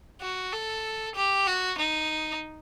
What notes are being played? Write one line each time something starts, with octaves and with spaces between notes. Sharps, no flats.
F#4
A4
G4
F#4
D#4